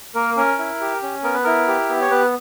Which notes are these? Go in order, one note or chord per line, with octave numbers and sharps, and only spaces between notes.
A#3 A#4
C#4 A#4
E4
G4
C#4
B3 A#4
B4
E4 A#4
G4
B3
C#5
B3 B4